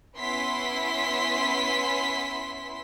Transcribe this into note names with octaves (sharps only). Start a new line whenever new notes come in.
B3 C#4 E4 C6 B6